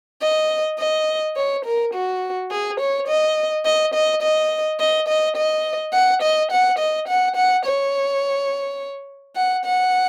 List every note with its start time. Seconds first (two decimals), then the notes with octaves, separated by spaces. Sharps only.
0.22 D#5
0.79 D#5
1.37 C#5
1.65 A#4
1.94 F#4
2.51 G#4
2.80 C#5
3.08 D#5
3.65 D#5
3.94 D#5
4.23 D#5
4.80 D#5
5.08 D#5
5.37 D#5
5.94 F#5
6.22 D#5
6.52 F#5
6.79 D#5
7.08 F#5
7.36 F#5
7.65 C#5
9.36 F#5
9.65 F#5